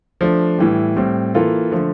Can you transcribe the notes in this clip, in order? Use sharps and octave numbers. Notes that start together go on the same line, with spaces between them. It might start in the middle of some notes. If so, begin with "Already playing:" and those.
F3 A3 D4
A2 E3 G3
A2 G3 C4
E3 A#3 F4 A4
D3 F3 A3